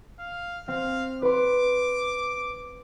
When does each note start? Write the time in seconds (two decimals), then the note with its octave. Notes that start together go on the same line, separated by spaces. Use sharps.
0.19 F5
0.68 C4 F5
1.22 B4 C6 D6